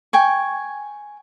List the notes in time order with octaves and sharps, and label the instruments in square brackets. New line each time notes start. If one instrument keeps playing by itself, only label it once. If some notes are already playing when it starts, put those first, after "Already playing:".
[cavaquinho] G5 G#5 C#6